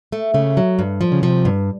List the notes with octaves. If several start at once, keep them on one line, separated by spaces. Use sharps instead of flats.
A3
C#3 A3
F#3
G2
F3
C#3
C3 F3
G2